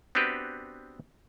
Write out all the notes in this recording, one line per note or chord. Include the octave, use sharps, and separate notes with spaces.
B3 C4 D4 F#4 G4 B4